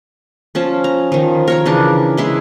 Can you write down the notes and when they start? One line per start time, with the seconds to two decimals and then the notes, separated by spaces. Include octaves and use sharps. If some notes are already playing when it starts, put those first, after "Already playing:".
0.55 F3 C#4 A5
0.84 A#5
1.12 D#3 F3
1.48 A#4 C#5 A#5
1.66 C#3 E3 D4
2.17 G#3 E4 G#4